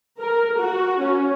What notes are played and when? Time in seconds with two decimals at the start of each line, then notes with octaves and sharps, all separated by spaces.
0.20 A#4
0.57 F#4
1.01 C#4